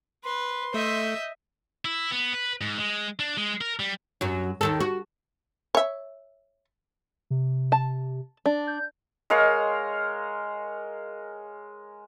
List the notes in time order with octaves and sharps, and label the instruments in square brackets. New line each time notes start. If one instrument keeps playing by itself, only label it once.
[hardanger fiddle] B4 [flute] C6
[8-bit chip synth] A3 [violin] D#5 G6 [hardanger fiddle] E5
[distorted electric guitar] E4
B3
B4
G#2
G#3
D4
G#3
A#4
G3
[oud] F#2 F#3
D#2 D#3 A4
F#4
[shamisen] C#5 E5
[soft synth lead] C3
[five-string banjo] A5
D4
[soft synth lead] G6
[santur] G#3 A#4 C#5 F5